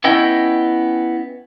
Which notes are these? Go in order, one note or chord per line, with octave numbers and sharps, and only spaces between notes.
B3 C#4 E4 D#5 G5